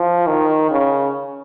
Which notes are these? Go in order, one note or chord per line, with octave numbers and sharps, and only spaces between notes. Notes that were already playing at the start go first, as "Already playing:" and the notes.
Already playing: F3
D#3
C#3